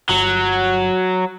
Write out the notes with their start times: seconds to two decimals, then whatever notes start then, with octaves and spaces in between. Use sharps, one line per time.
0.09 G1 F#3